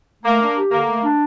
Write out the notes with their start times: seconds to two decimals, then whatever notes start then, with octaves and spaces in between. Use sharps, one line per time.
0.24 A3 A#3
0.40 D4
0.56 G4
0.72 D3 A#3
0.88 A3
1.04 D4